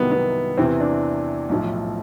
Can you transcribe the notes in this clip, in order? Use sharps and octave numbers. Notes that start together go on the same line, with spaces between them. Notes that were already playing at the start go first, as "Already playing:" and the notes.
Already playing: C2 C3 D#3 F#3 B3
B3
E2 C3 E3 C4
D4
B1 A2 F3